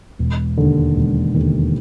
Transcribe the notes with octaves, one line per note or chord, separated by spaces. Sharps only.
E1
D#2 D3
E1
D#2 D3